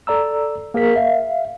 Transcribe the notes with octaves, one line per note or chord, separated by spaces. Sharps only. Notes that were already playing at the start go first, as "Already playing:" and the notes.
A4 D5 A#5 E6
A#3 G#4 A#4 B6
E5 F5